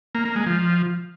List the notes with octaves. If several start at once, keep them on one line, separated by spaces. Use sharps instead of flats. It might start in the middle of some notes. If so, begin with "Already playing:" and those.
A#3
A#3
G#3
F3